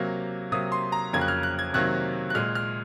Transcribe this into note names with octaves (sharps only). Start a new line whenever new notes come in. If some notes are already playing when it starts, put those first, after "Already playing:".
Already playing: C3 F#3 A#3
C3 F#3 A#3 D#6
C6
A#5
F2 C#3 F#3 A#3 G#6
F#6
F6
F#6
G#6
C3 D#3 F#3 A#3 F#6
F#6
A#2 G#3 F6
F6